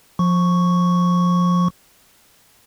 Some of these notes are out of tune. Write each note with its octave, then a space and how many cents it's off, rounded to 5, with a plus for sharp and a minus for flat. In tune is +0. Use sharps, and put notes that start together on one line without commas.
F3 +20 C#6 +0